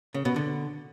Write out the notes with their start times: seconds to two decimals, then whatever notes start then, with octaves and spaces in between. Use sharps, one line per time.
0.14 C#3
0.25 B2
0.36 D3